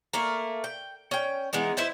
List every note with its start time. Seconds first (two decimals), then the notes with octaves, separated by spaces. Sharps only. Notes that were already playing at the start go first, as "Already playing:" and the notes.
0.13 A3 A#3 A#4
0.64 G5
1.11 C#4 G5
1.53 E3 G#3 B3 D#4
1.77 E4 B4 C5 D#5